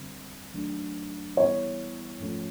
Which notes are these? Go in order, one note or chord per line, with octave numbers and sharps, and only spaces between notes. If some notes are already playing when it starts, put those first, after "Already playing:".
Already playing: D3 G3 C4
D#3 F#3 A3 D4
E3 G3 B3 E4 C#5
G#2 F3 A3 C#4 F4